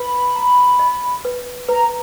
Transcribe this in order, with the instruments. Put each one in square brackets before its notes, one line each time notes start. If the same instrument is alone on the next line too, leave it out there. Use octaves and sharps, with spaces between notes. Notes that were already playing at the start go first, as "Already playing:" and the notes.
Already playing: [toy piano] B4 [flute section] B5
[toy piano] A#5
D#5
B4
[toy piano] B4 [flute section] A#5